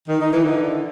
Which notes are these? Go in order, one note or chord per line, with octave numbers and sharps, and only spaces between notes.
D#3
D#4
E3
D3